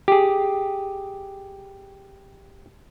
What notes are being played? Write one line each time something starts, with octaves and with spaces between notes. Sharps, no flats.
G4 G#4